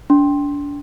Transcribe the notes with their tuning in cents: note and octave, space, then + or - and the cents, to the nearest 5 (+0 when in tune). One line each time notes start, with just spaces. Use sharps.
D4 -30 G5 +0 C6 +10